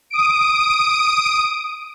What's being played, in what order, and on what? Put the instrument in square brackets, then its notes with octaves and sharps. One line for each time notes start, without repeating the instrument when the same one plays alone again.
[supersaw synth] D#6 D7